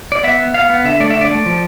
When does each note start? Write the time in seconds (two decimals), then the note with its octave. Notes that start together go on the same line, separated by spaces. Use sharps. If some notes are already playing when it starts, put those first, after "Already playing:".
0.12 D5
0.23 B3 E5
0.39 B3
0.54 B3 F5
0.70 B3
0.85 D3 E5
1.00 A3 D5
1.10 D3 E5
1.21 D5
1.31 A3
1.46 F3